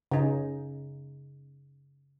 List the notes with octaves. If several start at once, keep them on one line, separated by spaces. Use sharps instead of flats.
C#3 D#4